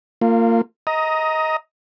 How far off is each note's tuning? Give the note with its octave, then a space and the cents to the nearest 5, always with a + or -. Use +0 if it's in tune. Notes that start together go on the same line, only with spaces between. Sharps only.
A#3 -30 F4 +0
D#5 +20 A#5 +0 D#6 +10